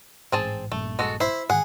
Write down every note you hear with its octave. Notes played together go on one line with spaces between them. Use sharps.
A1 G#2 C4 G#4 A5
A#1 G2 A#2 A3
G#3 F#4 A4
E4 C5 E5
G#2 D#3 G#4 F#5